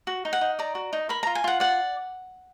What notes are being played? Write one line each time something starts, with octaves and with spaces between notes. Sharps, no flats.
F#4
D#4
F#5
D#4
D5 A#5
F#4
D#4
A#4 B5
F4 A#5
G#5
F4 F#5
D5 F#5